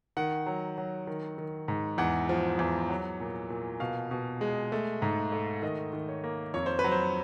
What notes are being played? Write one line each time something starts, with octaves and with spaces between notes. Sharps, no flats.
D#3 F#5
F#3
F#3
D#3
D#3
G#2
E2 F#5
F3
E2
F#3
A#2
A#2
B2 F5
B2
G#3
A3
G#2
A3
D#3 D#5
D#3
C#5
A#3
F2 C#5
C5
B4
F#3
C5